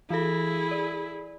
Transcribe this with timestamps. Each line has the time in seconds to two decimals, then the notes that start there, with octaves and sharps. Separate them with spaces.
0.10 E3 E4 G#4 A4
0.71 D5